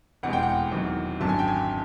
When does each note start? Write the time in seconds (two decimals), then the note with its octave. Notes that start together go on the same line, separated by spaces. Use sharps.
0.23 F1 E2 B2 G#3 F#5
0.33 G5
0.43 F#5
0.71 E2 C3 D#3 F#3
1.20 G#1 F#2 D3 F#3 A5
1.29 G#5
1.39 G5
1.48 G#5